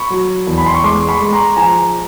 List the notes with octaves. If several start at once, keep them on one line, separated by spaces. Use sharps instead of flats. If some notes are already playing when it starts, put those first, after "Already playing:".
Already playing: B5 C#6
F#3
E2
B5
C6
C#6
G#3 C6 D6
B5 C#6
G#3
A#5 C6
F3 G#5 A#5